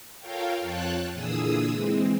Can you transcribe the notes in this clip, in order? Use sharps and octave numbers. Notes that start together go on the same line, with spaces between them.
F4 A4 A#4 C#5 F5 G5
F2 F4 C#5 G5 A5 F#6
A#2 D3 E3 G#4 D#6 E6
E3 G#3 C4